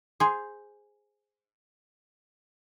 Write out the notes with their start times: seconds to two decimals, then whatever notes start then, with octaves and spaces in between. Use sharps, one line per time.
0.20 G#4 C5